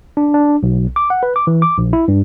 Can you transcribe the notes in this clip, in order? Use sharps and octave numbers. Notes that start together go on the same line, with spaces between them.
D4
D4
B1
D6
F#5
B4
D6
E3
D6
A#1
E4
G2